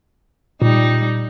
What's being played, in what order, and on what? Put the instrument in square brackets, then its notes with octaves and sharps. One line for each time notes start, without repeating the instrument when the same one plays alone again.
[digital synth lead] A#2 [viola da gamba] G3 D#4